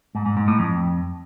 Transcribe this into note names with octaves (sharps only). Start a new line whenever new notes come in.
G#2
G#2
G#2
A2
F2